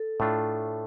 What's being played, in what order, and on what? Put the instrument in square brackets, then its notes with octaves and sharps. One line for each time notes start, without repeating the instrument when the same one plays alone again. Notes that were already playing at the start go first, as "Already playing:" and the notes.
Already playing: [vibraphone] A4
[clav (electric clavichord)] A2 A3 D4 F4